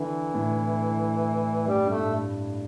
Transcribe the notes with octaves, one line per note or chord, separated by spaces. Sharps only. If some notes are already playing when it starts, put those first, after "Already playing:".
Already playing: D3 E3
A2
G2 G3
G2 A3
A2